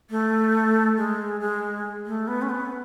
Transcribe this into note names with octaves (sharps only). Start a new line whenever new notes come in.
A3
G#3
G#3
A3
B3
C#4
B3